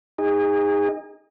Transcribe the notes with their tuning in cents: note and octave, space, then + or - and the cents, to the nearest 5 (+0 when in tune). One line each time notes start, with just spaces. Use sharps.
D#4 +0 G#4 -35